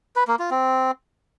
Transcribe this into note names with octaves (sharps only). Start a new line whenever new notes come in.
B4
A#3
F4
C4